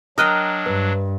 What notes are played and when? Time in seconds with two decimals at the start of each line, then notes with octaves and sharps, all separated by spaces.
0.18 F#3 D4 A#4 D#5 G5 D#6 F6 F#6
0.66 G2 B4